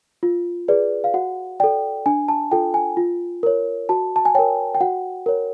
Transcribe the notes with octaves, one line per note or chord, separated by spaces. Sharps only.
F4
G#4 B4 D5
F5
F#4 F#5
A4 D5 G5
D4 G#5
A5
F4 A4 G5
G#5
F4
A#4 C#5
F#4 A5
A5
G#5
A#4 C#5 G5
G5
F#4 F#5
A#4 C#5